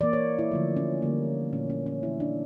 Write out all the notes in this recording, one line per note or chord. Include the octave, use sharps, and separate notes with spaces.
E3 A#3 D5
C#5
E4
D3 F3 A3
C#4
D3 G3 A#3
A#2 A3 C#4
C#4
C#4
E3 A#3 E4
D4